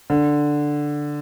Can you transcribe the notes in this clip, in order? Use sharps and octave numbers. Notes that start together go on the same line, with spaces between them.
D3